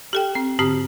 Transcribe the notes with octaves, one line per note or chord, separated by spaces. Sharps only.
G4 A4 G5
C4
G#2 D3 C4 G4